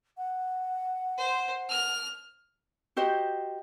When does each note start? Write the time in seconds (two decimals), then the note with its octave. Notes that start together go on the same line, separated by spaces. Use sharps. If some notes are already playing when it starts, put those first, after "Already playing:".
0.17 F#5
1.18 C5
1.69 F6
2.96 F#4 G4 C5 D#5